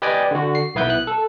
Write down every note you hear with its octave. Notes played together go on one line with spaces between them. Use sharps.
G4 B4 D5 D#5 G5 G#5
D3 F#4
C7
B1 B3 E4 B4 G6
F#6
A4